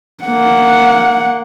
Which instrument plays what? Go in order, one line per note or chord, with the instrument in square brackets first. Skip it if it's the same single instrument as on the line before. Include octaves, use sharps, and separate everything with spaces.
[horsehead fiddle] A#3 F#5